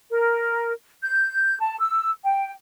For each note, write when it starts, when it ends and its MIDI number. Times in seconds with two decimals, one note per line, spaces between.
0.10 0.72 70
1.02 1.58 91
1.60 1.78 81
1.79 2.10 88
2.24 2.52 79